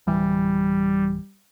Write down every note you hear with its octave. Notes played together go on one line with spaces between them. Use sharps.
D1 E3 G3